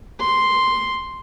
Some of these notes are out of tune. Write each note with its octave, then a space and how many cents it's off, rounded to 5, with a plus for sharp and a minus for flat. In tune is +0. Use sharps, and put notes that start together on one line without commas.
C6 +0